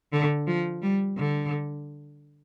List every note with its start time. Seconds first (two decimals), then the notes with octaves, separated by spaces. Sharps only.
0.13 D3
0.47 F3
0.82 G3
1.17 D3